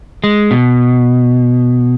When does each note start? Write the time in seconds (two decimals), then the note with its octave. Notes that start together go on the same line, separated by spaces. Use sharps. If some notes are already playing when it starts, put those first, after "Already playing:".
0.24 G#3
0.51 B2